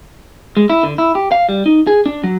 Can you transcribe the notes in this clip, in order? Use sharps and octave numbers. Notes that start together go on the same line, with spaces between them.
G#3
E4
D3
E4
G4
F5
G3
D#4
G#4
D4
F#3